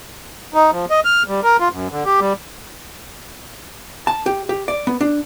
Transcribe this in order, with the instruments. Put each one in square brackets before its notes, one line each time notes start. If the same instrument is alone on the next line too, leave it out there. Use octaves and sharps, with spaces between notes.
[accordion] D#4
F3
D#5
F6
G3
A#4
F4
F#2
D3
G4
G3
[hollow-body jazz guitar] A5
G4
G4
D5
B3
D4